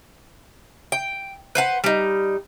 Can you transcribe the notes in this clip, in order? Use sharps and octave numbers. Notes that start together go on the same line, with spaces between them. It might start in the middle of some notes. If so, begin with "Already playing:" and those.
G5
B4 C5 F#5
G3 D#4